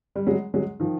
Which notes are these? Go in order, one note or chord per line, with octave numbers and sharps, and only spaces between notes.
G3
F#3 G#3
F#3 G#3
D#3 F3